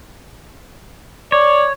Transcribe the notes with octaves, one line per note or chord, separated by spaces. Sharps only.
C#5 D5